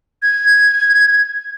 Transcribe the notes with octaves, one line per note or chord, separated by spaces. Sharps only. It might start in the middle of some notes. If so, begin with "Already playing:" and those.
G#6